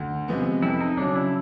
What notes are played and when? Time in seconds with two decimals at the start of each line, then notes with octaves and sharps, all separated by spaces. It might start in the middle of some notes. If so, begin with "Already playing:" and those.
Already playing: D2
0.28 C3 F3 G#3 B3
0.62 F2 E4
0.81 D#4
0.98 C#3 F#3 D4
1.15 E4